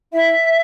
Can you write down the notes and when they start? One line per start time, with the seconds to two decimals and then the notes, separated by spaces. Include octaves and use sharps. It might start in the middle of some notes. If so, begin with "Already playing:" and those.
0.12 E4 E5